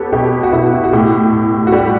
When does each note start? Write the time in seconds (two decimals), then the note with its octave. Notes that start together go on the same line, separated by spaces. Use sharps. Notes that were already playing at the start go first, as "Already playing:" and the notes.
Already playing: B3 G4 A4 B4 C#5
0.13 B2 G4
0.43 F#4
0.52 B2 E4
0.73 E4
0.84 F#4
0.93 A2 G4
1.33 A2
1.67 F#4
1.72 G3 G4